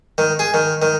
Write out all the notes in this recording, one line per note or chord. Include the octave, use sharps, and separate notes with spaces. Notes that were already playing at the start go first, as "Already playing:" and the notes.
D#3
G#4
D#3
D#3